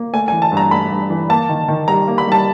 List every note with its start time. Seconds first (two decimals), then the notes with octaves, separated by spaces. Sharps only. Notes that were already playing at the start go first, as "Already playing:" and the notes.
Already playing: A#3
0.13 A3 G#5
0.28 G#5
0.32 E3
0.42 A5
0.52 G2
0.57 A#5
0.71 A3 B5
0.91 G2
1.10 E3
1.29 A#3 A5
1.49 D#3
1.68 D#3
1.88 G3 A#5
2.07 A#3
2.18 B5
2.27 G3 A5